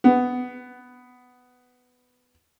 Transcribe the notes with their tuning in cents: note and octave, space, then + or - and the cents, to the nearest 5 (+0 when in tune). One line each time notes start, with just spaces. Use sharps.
B3 +10